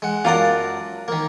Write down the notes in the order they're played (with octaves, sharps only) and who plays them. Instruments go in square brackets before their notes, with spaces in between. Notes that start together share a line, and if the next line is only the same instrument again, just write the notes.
[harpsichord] G#3 F#5
[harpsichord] F#2 D5 A5 [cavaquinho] F4 A#4 F#5
[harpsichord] D#3 A#3